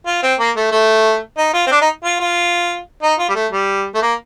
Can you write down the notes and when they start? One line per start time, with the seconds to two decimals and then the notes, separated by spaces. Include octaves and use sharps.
0.06 F4
0.23 C4
0.39 A#3
0.56 A3
0.71 A3
1.37 D#4
1.54 F4
1.67 C4
1.71 D4
1.81 D#4
2.04 F4
2.20 F4
3.03 D#4
3.19 F4
3.29 G3
3.35 A3
3.51 G3
3.95 A3
4.02 A#3